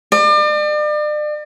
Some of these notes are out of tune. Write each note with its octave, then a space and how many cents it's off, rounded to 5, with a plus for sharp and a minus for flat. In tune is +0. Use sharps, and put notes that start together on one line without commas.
D5 +40